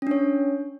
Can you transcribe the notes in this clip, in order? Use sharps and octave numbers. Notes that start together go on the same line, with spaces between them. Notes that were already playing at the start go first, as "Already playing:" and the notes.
C#4 D4 C#5